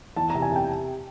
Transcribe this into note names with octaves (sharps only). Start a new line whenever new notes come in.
E2 A5
C3 A#5
G#5
C3 G5